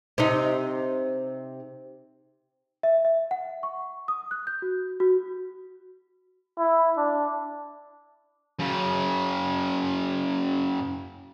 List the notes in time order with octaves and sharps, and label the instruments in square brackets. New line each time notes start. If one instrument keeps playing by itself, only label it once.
[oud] C3 D#4
[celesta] E5
E5
F#5
C#6
D#6
F#6
G6
F#4
F#4
[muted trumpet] E4
D4
[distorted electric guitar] F#2 C#3